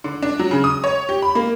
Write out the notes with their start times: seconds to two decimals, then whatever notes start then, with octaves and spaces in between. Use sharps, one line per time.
0.04 D3
0.22 D4
0.39 F#3
0.51 C#3
0.64 D#6
0.84 C#5
1.09 G4
1.22 B5
1.35 A#3